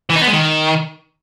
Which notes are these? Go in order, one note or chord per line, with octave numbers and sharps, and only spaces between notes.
E3
D#4
B3
G#3
D#3